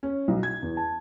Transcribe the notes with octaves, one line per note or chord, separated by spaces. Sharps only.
C#4
B1
G#6
E2
A5